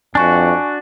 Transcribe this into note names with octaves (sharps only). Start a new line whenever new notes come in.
F2 D4 F#4 G#5 C#6